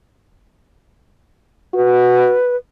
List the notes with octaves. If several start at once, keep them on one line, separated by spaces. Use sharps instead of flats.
F#4 B4